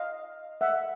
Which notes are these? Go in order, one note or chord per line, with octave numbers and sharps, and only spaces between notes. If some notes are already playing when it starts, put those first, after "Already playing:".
Already playing: D#5 F5
E5 F#5